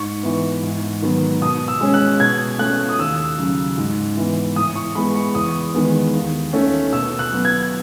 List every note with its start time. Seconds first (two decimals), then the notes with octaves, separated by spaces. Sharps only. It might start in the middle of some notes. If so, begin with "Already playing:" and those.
Already playing: G#2 C#6
0.23 E3 B3
0.63 G#2
1.02 D#3 F#3 B3
1.41 B2 D#6
1.68 E6
1.81 G#3 C#4
1.94 F#6
2.20 B2 G#6
2.59 A3 C#4 F#6
2.89 D#6
2.99 D#2 E6
3.38 C#3 F#3
3.78 G#2
4.17 E3 B3
4.56 A2 D#6
4.76 C#6
4.95 G#3 B3 B5
5.15 C#6
5.35 E2 D#6
5.74 D#3 G#3 B3
6.14 D#2
6.53 D#3 A3 C#4
6.93 B2 E6
7.19 F#6
7.32 F#3 B3
7.45 G#6